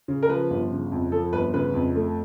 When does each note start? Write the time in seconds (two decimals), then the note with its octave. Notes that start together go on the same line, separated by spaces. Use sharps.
0.08 C#3
0.23 A#4
0.29 F3 B4
0.50 G1
0.71 C#3
0.92 F2
1.12 F3 A4
1.33 G1 B4
1.54 C#3 B4
1.74 F2
1.95 A3